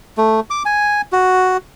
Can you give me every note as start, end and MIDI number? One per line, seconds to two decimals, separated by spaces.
0.17 0.40 57
0.50 0.63 86
0.65 1.01 80
1.12 1.57 66